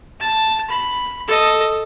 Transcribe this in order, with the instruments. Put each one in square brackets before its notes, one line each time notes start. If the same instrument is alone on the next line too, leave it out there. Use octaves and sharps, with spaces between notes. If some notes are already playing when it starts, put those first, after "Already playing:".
[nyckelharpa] A5
B5
A4 D#5